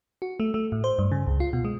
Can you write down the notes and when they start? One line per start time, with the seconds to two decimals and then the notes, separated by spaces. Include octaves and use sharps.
0.22 F#4
0.40 A3
0.54 A3
0.72 A2
0.84 C5
0.99 G2
1.12 C#3
1.27 C#2
1.40 F4
1.53 B2
1.65 G#3